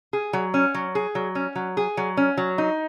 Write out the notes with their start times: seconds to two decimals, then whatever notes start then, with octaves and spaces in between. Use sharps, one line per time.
0.13 G#4
0.33 F#3
0.54 C#4
0.74 F#3
0.95 G#4
1.15 F#3
1.35 C#4
1.55 F#3
1.77 G#4
1.97 F#3
2.17 C#4
2.37 F#3
2.58 D#4